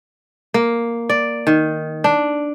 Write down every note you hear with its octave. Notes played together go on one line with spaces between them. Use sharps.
A#3
D5
D#3
D4